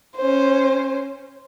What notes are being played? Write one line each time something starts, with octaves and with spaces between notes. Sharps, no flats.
C#4 C5